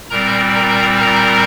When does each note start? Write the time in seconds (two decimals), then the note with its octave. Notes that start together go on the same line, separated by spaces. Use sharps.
0.10 A#2 G3 C4 A#4 A#5
0.55 A#4 A#5
0.99 A#4 A#5